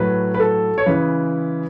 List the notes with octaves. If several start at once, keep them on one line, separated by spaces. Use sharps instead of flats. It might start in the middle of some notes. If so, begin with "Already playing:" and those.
Already playing: A2 F#3 B4
B4
A4
C#5
C#3 E3 G#3 B4